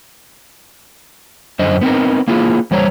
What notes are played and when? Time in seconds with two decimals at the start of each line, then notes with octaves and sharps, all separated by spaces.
1.59 F#2 D3 C5 D#5
1.81 B3 C4 D#4 A#4
2.28 A#3 E4 F4 G#4
2.71 E2 G3 C5 C#5 A#5